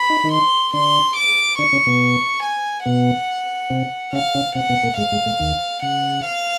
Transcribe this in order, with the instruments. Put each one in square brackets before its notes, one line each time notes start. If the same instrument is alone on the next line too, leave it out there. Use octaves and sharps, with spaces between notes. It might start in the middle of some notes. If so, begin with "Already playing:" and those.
Already playing: [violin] B5
[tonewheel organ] D#4
D#3 D#4
[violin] C6
[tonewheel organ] D3 D4 [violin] C6
[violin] D6
[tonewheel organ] D3 D4 [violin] C#6
[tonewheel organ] C#3 C#4
B2 B3
[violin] G#5
[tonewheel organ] B2 B3 [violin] F#5
[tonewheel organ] C3 C4
[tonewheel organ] C#3 C#4 [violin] F5
[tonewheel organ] C#3 C#4
[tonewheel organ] C3 C4 [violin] F#5
[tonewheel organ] B2 B3
A#2 A#3
[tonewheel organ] G#2 G#3 [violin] F5
[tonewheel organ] G#2 G#3
A2 A3
D#2 D#3
[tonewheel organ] C#3 [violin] F#5
[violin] F5